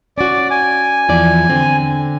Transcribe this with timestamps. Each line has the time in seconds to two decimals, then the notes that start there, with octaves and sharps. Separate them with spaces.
0.18 C#4 F#4 D5
0.51 G#5
1.09 E2 F3 D5
1.50 D3 C4